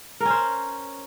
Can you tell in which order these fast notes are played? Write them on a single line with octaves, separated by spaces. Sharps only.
A#4 C#4 C5